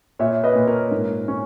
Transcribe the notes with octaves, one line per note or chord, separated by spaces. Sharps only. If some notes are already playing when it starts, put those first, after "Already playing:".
A#2 C#5 E5
B4 D#5
A#2
A#4 C#5
G#2
C#4